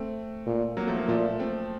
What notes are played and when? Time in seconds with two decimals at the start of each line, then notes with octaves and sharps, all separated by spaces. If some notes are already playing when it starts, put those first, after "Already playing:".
Already playing: A3 C4
0.46 A#2
0.77 F#3 A#3
0.87 F3 A3
0.97 F#3 A#3
1.08 A#2 F3 A3
1.40 A3 C4